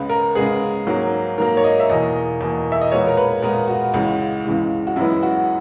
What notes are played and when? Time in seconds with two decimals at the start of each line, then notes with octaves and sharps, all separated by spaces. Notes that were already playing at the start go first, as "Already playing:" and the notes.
Already playing: C#2 C#3 G#3 B3 B4
0.09 A#4
0.35 C#2 C#3 G#3 B3 G#4
0.87 G#2 F#3 A#3
1.38 G#2 F#3 A#3 A#4
1.57 C#5
1.64 D#5
1.80 E5
1.89 E2 B2 A#3 D#5
2.41 E2 B2 A#3
2.72 E5
2.82 D#5
2.92 A#2 G#3 B3 C#5
3.07 A#4
3.17 B4
3.43 A#2 G#3 B3 A#4
3.68 F#4
3.94 C#2 C#3 E3 G#3
4.46 C#2 C#3 E3 G#3
4.87 F#4
4.96 F#2 E3 G#3 B3 E4
5.23 F#4